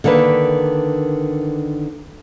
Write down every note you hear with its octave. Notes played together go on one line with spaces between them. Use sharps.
D3 D#3 A#3 D4 B4